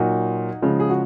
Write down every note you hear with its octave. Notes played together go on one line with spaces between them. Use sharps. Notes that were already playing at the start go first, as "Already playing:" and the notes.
Already playing: A#2 F#3 D#4 F#4
C#3 F3 G#3
G#4
F#4